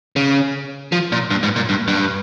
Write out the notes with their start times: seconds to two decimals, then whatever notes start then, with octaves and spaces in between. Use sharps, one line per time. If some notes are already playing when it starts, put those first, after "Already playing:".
0.16 C#3
0.92 F3
1.12 A#2
1.30 G2
1.43 G#2
1.56 A#2
1.69 G2
1.88 G2